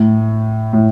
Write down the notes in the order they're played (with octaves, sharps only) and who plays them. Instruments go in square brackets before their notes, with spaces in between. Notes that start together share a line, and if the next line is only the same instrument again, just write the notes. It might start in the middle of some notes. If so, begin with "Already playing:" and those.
Already playing: [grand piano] A2
A2